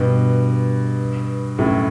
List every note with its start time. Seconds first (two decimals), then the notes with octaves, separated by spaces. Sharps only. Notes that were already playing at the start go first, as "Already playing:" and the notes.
Already playing: G2 B2
1.58 F#2 A2